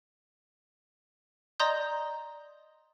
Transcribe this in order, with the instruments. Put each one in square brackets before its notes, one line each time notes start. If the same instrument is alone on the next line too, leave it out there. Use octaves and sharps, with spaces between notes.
[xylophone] D5 D#5 A#5 C6 D#6 G6